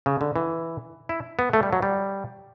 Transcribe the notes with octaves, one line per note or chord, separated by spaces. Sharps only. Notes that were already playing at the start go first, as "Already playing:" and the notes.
C#3
D3
E3
E4
B3
A3
G3
F#3
G3